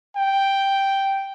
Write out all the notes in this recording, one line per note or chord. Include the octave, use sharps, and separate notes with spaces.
G5